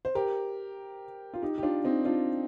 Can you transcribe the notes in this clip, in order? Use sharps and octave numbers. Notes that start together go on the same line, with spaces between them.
C5
G4 A#4
F4
D#4 G4
G4
D4 F4
C4 D#4
D4 F4